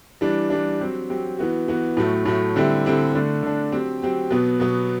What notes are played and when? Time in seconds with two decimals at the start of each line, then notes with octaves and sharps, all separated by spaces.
0.21 E3 G3 D4
0.50 E3 G3 D4
0.79 F#3 C4 G4
1.10 F#3 C4 G4
1.38 E3 B3 F#4
1.68 E3 B3 F#4
1.97 A2 F#3 A3
2.26 A2 F#3 A3
2.56 D3 G3 C4 E4 G4
2.85 D3 G3 C4 E4 G4
3.14 D3 A3 D4
3.43 D3 A3 D4
3.72 F#3 C4 G4
4.02 F#3 C4 G4
4.30 B2 F#3 B3
4.60 B2 F#3 B3